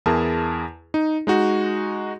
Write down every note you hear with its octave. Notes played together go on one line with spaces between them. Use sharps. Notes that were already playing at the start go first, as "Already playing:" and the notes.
E2 E4 G#4 A#4 A5
D#4
G#3 D#4 F#4